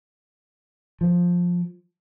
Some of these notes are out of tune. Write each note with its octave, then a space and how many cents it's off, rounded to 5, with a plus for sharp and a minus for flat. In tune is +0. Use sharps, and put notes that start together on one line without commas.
F3 +10